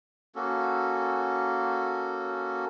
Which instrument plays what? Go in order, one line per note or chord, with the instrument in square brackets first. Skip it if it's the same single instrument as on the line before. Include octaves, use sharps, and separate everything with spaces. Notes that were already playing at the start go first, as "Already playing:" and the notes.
[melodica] A#3 C#4 F#4 A4